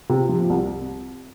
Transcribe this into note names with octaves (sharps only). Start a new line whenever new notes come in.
C3
F3
C2